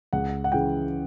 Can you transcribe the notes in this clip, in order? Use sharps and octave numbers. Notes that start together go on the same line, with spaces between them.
C#2 F#5
F#5
C#3 E3 G5